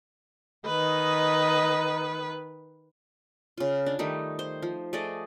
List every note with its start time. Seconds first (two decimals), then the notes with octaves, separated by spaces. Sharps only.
0.66 D#3 B4 D#5
3.58 C#3 F4
3.86 D4
3.99 D#3 G3 A3 D#4
4.39 C5
4.62 F3
4.93 A3 G#4 D5 D#5